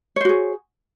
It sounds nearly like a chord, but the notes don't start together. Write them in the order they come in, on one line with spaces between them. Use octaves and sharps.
C#5 C5 F#4 G#4